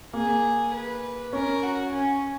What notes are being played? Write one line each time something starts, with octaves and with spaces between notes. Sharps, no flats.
A#3 G#4
B4
C#4 A#4
F#4
C#4